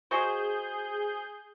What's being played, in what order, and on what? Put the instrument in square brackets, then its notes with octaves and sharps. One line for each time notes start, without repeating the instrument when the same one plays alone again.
[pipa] G#3 F#4 C5 [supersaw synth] G#4 G6